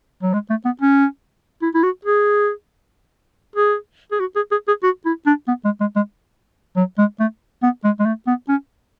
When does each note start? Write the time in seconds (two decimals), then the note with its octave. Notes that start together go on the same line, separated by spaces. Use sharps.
0.23 F#3
0.33 G#3
0.50 A3
0.65 B3
0.81 C#4
1.62 E4
1.75 E4
1.83 F#4
2.05 G#4
3.56 G#4
4.12 G#4
4.20 F#4
4.36 G#4
4.52 G#4
4.68 G#4
4.83 F#4
5.06 E4
5.27 D4
5.48 B3
5.65 G#3
5.81 G#3
5.96 G#3
6.76 F#3
6.98 G#3
7.20 A3
7.63 B3
7.84 G#3
8.00 G#3
8.06 A3
8.27 B3
8.49 C#4